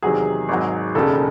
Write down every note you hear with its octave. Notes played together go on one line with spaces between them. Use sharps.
E2 C3 D#3 F#3 G#4
G#1 G#2 F#3
E1 D#2 C#3 A4